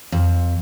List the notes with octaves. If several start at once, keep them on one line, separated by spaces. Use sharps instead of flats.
F2